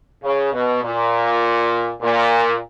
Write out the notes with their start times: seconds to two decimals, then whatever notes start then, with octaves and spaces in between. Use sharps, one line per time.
0.23 C#3
0.53 B2
0.83 A#2
2.02 A#2